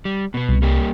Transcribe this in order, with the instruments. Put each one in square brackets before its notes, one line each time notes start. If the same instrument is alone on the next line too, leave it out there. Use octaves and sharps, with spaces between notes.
[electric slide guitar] G3
B2 B3
[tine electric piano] C2
[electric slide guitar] G3 A#3 G4